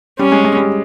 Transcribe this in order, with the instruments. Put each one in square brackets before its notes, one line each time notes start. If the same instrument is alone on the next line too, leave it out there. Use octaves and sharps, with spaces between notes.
[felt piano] G3 [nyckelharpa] C#4
[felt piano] G#3
G#3
G3